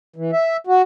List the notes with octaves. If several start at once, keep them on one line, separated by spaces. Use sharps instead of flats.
E3
E5
F#4